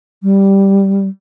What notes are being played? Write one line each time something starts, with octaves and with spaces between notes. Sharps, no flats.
G3